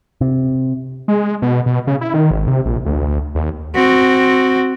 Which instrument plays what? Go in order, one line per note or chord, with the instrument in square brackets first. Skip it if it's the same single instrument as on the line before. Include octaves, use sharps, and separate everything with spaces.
[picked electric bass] C3
[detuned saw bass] G#3
B2
B2
C#3
E4
D#3
G#1
C3
A#1
D2
D#2
[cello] C4 F#4